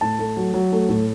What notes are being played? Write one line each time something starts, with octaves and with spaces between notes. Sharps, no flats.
A2 A5
A3
F#3
F#3
A3
A2